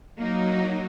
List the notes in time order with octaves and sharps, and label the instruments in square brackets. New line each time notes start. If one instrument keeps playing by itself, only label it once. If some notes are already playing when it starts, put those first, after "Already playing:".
[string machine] F#3 [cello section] A#3 D#4